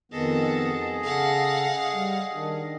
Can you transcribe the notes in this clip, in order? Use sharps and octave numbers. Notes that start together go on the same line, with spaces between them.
F2 D#3 B3 F#4 G#4 A4 D#5
C#3 A4 F5 F#5
G3
D#3 D4